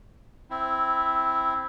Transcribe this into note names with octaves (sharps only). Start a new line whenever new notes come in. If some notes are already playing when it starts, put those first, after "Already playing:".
C4 E4